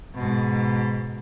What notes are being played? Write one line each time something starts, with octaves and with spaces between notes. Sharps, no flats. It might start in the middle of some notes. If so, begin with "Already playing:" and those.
G#2 B2